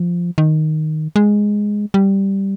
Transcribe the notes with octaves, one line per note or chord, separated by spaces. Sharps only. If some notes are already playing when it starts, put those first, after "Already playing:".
Already playing: F3
D#3
G#3
G3